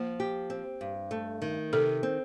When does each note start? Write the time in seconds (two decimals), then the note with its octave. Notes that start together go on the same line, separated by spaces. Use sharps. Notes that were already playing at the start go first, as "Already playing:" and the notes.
Already playing: F3 A#3
0.20 G4
0.50 C4
0.81 G2
1.11 A3
1.42 D#3
1.73 C3 A4
2.03 C4